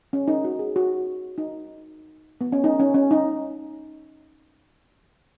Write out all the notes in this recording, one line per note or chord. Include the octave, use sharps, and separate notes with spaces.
C#4
D#4
F#4
G#4
F#4
D#4
B3
C#4
D#4
C#4
C#4
D#4